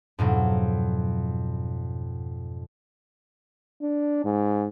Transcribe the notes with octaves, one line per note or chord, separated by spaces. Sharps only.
F2 G#2 B2 F#3
D4
G#2